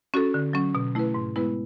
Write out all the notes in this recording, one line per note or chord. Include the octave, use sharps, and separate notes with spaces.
C#4 F#4 A4
D3
F#3 C#4
B2
A3 E4 B4
G#2
G#3 B3 E4 B4